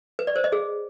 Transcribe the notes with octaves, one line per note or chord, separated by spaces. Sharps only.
B4
D5
C5
D#5
G#4